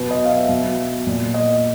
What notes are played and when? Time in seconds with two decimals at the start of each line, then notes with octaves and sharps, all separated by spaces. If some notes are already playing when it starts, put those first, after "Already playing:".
Already playing: B2 B4
0.11 D#5
0.25 F5
0.30 E5
0.49 B2
1.07 A#2
1.34 D#5